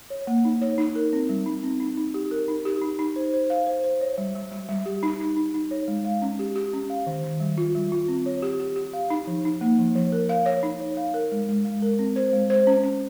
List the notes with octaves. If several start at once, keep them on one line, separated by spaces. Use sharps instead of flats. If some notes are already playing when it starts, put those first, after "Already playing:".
C#5
A#3
D#4
C#5
D#4
A#4
C4
G3
D#4
C4
D#4
D#4
G4
A#4
D#4
G4
D#4
D#4
C5
C5
F5
C5
C5
C#5
G3
G3
G3
G3
G4
D#4
D#4
D#4
D#4
C#5
G#3
F5
C#4
G4
G4
C#4
F5
D#3
D#3
G3
F4
G3
F4
C4
C#5
G4
G4
G4
F5
D#4
F3
D#4
A#3
F3
F3
A#4
F5
C#5
D#4
C#5
F5
A#4
G#3
G#3
G#3
A#4
C4
C5
G#3
C5
C#4
C#4